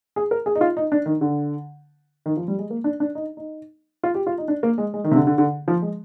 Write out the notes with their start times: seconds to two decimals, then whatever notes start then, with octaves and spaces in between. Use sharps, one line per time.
0.16 G#4
0.31 A#4
0.46 G#4
0.55 D#4
0.61 F4
0.77 D#4
0.92 D4
1.06 D#3
1.21 D3
2.26 D#3
2.37 F3
2.48 G3
2.59 G#3
2.70 A#3
2.84 D4
3.00 D4
3.15 D#4
3.37 D#4
4.03 F4
4.15 G4
4.27 F4
4.38 D#4
4.48 D4
4.63 A#3
4.78 G#3
4.94 G#3
5.04 D#3
5.11 C3
5.16 D3
5.27 D3
5.38 D3
5.68 F3
5.82 G#3